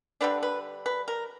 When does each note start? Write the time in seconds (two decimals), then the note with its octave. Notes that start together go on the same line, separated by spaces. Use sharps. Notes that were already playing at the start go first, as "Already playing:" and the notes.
0.21 D3 G3 B3 D4 B4
0.43 B4
0.86 B4
1.08 A#4